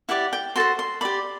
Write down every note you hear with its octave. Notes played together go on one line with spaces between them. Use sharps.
E4 G4 D5 F#5
G5
F#4 A4 C5 C6
C6
G4 D5 B5